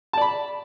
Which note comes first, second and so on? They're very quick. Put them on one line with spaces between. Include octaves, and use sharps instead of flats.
A5 D5 B5